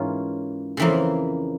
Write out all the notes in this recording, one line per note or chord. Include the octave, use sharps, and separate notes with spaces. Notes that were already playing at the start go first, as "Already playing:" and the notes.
Already playing: G#2 E3 A#3 C#4 F4
F2 C#3 E3 A#3